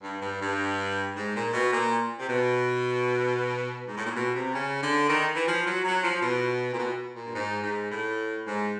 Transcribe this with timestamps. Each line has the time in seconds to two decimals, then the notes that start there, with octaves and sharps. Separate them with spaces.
0.02 G2
0.21 G2
0.40 G2
1.15 G#2
1.34 A#2
1.52 B2
1.72 A#2
2.19 C3
2.28 B2
3.87 G#2
3.96 A2
4.05 A#2
4.14 B2
4.33 C3
4.52 C#3
4.81 D3
5.08 D#3
5.34 E3
5.46 F3
5.65 F#3
5.84 F#3
6.02 F3
6.21 B2
6.72 A#2
6.78 B2
7.14 A#2
7.25 G2
7.33 G#2
7.62 G#2
7.90 A2
8.45 G#2